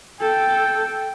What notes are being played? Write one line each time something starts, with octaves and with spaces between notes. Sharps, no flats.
A4 G5